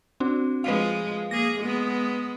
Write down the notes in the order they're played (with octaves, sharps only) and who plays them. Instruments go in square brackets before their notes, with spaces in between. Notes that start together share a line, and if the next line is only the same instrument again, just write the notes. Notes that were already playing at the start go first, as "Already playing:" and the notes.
[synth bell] C4 D4 F#4
[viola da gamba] F3 G#3 [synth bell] B4 F5
[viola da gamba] A#3 G#4 [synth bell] A#6
[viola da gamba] G#3 B3